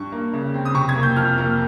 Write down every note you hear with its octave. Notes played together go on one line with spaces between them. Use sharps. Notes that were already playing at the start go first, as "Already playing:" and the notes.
Already playing: G2 C#6
A#3
C#3
C4
D#6
C3 C#6
G#6
A#3
G6
F2 F6
A#3